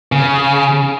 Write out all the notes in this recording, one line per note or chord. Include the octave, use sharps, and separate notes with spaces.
C#3